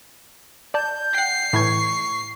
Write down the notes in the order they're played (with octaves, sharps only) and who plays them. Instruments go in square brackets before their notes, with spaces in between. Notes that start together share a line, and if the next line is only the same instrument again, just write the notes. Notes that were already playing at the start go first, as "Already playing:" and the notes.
[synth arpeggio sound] D5 A5 [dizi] G6
[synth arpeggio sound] F#5 G5 [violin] C7
[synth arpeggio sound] A2 E3 G#6 [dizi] C#6